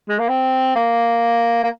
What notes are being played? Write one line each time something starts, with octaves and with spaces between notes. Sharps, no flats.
G#3
A#3
C4
A#3
A#3